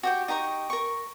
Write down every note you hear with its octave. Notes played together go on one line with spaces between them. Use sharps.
F#4 G4 G5
D#4 G4 A#5 C#6
A#4 C#6